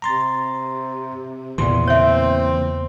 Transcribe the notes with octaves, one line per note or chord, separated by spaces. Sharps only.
C3 A#5 C6 A6
E2 A#2 C#3 E3 C6
C4 C#5 E5